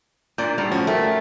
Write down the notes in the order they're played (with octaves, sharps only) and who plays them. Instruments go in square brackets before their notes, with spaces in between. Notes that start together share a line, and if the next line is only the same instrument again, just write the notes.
[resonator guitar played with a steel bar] A#2 [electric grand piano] D4 D5 G6
[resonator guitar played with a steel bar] A2 [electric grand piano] G3
[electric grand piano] F3 C#4 F#4
[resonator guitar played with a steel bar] A3 [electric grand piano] A#4 G5